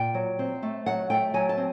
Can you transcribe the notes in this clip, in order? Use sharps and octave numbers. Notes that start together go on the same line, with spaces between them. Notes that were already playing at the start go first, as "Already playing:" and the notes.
Already playing: A#2 G5
F#3
C4
A3
F#3 F#5
A3 G5
F#3 G#5
A5
C4